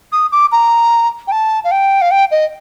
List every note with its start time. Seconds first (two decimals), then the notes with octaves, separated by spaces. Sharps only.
0.12 D#6
0.32 D6
0.52 A#5
1.27 G5
1.32 A5
1.64 F5
1.71 G5
2.01 F5
2.11 G5
2.31 D#5